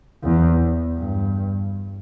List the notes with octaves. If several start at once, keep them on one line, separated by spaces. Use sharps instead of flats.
E2
G2